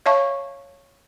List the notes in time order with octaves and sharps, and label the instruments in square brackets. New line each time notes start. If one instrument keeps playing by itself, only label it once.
[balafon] C#5 E5 F5 A5 C#6